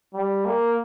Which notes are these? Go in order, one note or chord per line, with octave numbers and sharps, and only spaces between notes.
G3
A#3